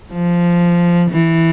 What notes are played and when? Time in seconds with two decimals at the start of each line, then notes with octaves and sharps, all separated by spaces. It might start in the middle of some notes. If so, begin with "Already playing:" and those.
0.11 F3
1.11 E3